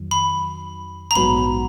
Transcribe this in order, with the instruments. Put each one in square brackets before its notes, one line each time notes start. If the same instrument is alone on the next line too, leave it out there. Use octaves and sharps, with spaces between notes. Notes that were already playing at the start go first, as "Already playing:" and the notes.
Already playing: [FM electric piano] F2 D#3 F#3
[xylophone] B5
A#5
[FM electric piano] A#1 G#2 F#3 B3 F#4 [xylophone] B5